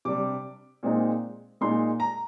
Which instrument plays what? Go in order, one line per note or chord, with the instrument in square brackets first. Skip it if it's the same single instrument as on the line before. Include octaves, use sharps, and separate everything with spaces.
[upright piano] C3 G3 D4 D6
A#2 G#3 C4 D#4
A#2 G#3 D#4 C6
A#5